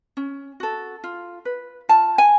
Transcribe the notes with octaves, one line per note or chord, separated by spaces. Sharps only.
C#4
F#4 A4
F4
B4
F4 A5
G#5